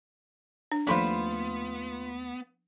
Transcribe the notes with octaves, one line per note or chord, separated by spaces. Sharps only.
D4
D#2 F3 A3 B3 F4 A4 C5 B5